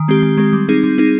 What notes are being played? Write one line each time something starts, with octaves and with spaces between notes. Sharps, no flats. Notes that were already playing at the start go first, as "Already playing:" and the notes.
Already playing: D#3
G#3 C4 G4
D#3
G#3 C4 G4
G3
C4 D#4 G#4
G3
C4 D#4 G#4